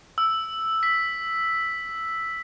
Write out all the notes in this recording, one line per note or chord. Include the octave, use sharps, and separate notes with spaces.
E6
B6